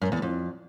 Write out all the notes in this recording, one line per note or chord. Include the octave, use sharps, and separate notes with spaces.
F#2
E2
F2